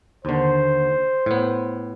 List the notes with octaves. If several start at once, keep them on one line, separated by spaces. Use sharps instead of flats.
D#2 D3 C5
A2 B3